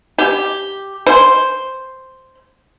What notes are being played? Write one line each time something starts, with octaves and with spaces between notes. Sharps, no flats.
G4
C5